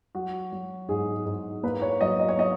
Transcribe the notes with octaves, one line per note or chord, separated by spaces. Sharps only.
F#3 F#4
F#3
G#2 G#4
G#2
A#3 B4
C#5
F#3 D#5
D#5
C#5
A#3 D#5